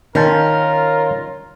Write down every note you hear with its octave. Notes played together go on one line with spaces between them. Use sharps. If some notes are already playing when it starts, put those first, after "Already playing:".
D#3 C#4 F4 A#4 G5 A5